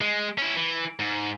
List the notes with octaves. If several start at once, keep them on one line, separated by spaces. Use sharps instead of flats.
G#3
C#4 E4
E3
G#2